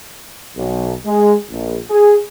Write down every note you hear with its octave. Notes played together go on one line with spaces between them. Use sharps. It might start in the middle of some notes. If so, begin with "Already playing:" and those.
B1
G#3
A#1
G#4